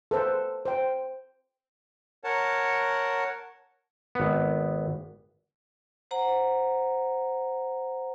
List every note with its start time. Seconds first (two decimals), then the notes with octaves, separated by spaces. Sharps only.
0.11 A4 B4 C5
0.65 C5 G5
2.24 A#4 C#5 F#5 A5
4.15 G#1 B3
6.11 C5 F#5 A#5